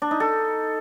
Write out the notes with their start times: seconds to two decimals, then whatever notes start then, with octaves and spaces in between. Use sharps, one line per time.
0.02 D4
0.11 D#4
0.20 A4